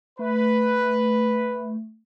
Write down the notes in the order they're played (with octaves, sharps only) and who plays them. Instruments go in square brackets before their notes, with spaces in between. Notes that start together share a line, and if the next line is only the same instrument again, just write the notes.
[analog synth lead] A3 [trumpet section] B4